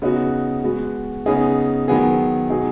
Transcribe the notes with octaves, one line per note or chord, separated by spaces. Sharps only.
C#3 B3 D#4 F#4
G#3 B3 F#4
C#3 B3 D#4 G#4
D#3 F#3 B3 G#4
B2 F#3 D#4 G#4